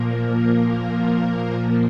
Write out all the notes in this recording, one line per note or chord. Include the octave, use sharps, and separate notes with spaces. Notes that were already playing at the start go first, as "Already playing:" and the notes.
Already playing: A#2 F3 A#3 A#4
A#2 F3 A#3